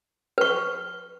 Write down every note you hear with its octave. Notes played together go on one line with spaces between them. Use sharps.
B4 C#6